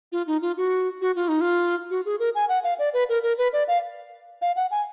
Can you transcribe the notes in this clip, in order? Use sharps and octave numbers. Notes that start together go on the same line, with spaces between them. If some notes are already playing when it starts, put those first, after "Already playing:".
F4
D#4
F4
F#4
F#4
F4
D#4
F4
F#4
G#4
A#4
G#5
F#5
F5
D5
B4
A#4
A#4
B4
D5
F5
F5
F#5
G#5